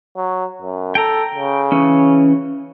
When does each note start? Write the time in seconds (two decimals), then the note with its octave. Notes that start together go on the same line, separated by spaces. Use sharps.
0.16 F#3
0.62 F#2
0.95 A4 G5 A#5
1.35 C#3
1.72 E3 C#4